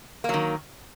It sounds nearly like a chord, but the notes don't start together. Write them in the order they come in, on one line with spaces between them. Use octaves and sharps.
A#3 F#3 D#3